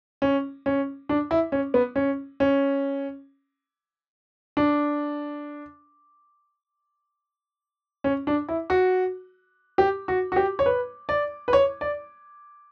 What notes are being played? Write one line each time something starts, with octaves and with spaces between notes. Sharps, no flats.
C#4
C#4
D4
E4
C#4
B3
C#4
C#4
D4
C#4
D4
E4
F#4
G4
F#4
F#4
G4
C#5
B4
D5
B4
C#5
D5